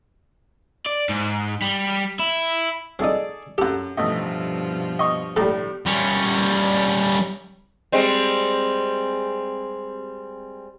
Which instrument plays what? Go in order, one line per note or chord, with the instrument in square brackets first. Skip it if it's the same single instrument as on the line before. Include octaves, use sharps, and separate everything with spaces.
[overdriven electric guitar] D5
G#2
G3
E4
[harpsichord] C4 D#4 [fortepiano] G#4 A4 D5
[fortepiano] F#2 A4 [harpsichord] G4 F#5
[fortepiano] A1 A3 D#5 [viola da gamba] G2 B2 F3
[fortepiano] D#5 C#6
[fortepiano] A2 G3 [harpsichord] A4 A5 A#5
[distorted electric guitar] G3 C#4
[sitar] G3 G#3 C4